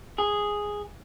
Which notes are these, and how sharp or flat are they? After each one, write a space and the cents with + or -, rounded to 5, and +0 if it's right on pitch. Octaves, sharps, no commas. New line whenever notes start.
G#4 -5